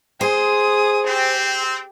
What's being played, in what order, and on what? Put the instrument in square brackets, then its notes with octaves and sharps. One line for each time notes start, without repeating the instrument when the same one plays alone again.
[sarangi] G#4 [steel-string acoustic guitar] C5 [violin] D#6
[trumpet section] C4 [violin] G4